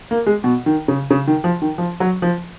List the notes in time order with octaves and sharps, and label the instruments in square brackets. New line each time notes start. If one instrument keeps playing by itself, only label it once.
[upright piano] A#3
G#3
B2
D#3
C#3
C#3
D#3
F3
D#3
F3
F#3
F3